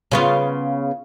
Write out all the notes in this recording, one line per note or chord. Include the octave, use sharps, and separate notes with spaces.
C#3 B3 F4